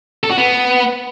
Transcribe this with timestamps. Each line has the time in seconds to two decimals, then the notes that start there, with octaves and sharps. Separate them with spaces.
0.24 A4
0.31 F#4
0.38 B3